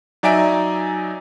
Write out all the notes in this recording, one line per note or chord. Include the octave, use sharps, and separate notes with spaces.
F#3 D#4 D5 E5 G#5 D7